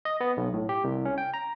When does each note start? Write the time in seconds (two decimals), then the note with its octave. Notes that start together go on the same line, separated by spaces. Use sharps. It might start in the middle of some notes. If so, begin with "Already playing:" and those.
0.05 D#5
0.21 B3
0.37 B1
0.54 A2
0.69 G4
0.84 C2
1.05 C#4
1.18 G5
1.34 A#5